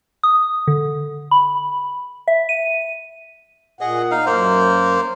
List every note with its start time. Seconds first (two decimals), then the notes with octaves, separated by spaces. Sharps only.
0.23 D#6
0.67 D3
1.31 B5
2.28 E5
2.49 D#7
3.81 A#2 G#4 D#5 F#5
4.11 D#4 F5
4.26 F#2 A#3 C5